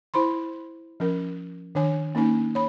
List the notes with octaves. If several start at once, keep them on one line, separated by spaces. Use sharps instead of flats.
E4 C5 B5 C6
F3 C#4 A#4
D#3 D4 C#5 G#5
A#3 C#4 D#4 G#5
C#5 B5